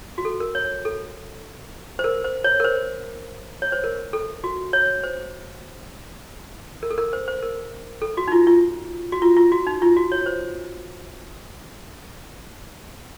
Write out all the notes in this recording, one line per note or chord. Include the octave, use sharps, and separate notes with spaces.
F#4
A4
A#4
C#5
A4
C5
A#4
C5
C#5
A#4
C5
C#5
C5
A#4
A4
F#4
C#5
C5
A#4
A4
A#4
C5
C5
A#4
A4
F#4
D#4
F4
F4
F#4
F4
F4
F#4
D#4
F4
F#4
C#5
C5